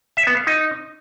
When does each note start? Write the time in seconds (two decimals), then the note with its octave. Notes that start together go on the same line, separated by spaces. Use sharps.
0.17 E5
0.27 B3
0.37 F5
0.47 D#4